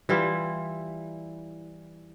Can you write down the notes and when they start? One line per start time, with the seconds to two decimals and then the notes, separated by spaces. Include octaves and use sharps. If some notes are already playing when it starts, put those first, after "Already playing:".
0.09 E3 G3 E4 F4